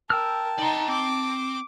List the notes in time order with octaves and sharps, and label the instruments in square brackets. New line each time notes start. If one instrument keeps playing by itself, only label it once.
[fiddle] A#4 [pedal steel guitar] G5 E6 F6 [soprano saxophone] A5
[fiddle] D#4 A#5 [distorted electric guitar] D5 C6
[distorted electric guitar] C4 [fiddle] D6